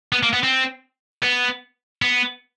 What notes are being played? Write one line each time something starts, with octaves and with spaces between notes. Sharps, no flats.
B3
A#3
B3
C4
B3
B3